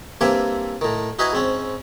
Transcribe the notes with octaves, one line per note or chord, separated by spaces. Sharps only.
G2 A#3 C4 E5 G#5 D6
A2 D#3
D#4 E4 F#4 B4 D#5 G#5
G#2 C4 C#4